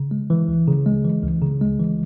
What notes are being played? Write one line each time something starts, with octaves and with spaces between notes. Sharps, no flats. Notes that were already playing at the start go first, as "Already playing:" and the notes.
Already playing: C#3
G#3
E3
C#2
C#3
G#3
E3
C#2
C#3
G#3
E3